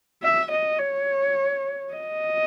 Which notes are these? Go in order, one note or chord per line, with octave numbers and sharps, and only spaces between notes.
E5
D#5
C#5
D#5